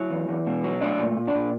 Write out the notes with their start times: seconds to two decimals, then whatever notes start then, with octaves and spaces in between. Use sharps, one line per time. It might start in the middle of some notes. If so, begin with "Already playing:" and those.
Already playing: F#3 E4 E5
0.10 E2
0.28 E2
0.46 B2
0.64 F#3
0.81 A3 D4 D5
0.99 A#2
1.17 A#2
1.27 D4 D5
1.34 A#2